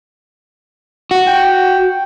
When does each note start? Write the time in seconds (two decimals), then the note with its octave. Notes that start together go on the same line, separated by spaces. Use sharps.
1.11 F#4
1.27 G5